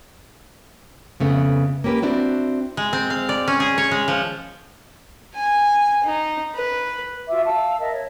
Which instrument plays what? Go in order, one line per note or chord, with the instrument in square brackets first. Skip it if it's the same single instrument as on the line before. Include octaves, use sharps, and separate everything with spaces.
[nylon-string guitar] F2 C#3 A3 B3
A#3 C#4 G4 B4
C4 D4 E4 F#4
[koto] G#3
C4
F5
D5
C#4
G#4
C#5
G#3
F3
[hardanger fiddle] G#5
D#4
B4
[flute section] F4 F#4 E5 D6
F5 A5 E6
A#4 D#5 E5 A5
C#5